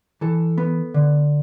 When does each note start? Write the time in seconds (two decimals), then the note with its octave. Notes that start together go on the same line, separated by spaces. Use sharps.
0.21 E3 A4
0.58 B3
0.94 D3